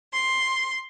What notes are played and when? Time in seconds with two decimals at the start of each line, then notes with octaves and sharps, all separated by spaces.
0.14 C6